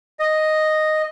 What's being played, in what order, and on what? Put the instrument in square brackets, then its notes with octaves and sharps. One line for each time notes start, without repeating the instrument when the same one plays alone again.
[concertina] D#5